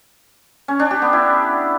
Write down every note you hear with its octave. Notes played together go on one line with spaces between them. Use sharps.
C#4
D4
G4
B3
E4